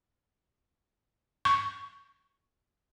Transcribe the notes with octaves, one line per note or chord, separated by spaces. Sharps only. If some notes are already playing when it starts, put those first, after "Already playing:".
C#6